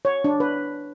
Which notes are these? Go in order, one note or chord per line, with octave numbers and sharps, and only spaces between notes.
C#5
D4
B4